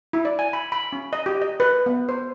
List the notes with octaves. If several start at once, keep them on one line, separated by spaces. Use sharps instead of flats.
E4
D5
G#5
B5
B5
C#4
D#5
G4
D#5
B4
B3
C5